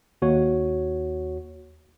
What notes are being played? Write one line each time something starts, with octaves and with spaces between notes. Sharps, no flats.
D#2 F#4 C#5